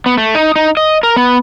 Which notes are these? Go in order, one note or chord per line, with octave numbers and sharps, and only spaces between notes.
B3
A3
D#4
D#4
D#5
A#4
B3